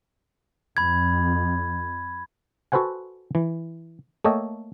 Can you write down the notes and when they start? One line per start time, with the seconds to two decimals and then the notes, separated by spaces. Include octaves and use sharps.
0.77 F2 B5 G#6
2.72 F#4 A4 B4 C5 F#5 G#5
3.35 E3
4.25 A3 A#3 A4 C#5 D#5 G5